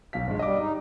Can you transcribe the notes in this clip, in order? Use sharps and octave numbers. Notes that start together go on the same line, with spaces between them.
B1 F5 B6
G1 G#3
G3 D#5 D6
D#4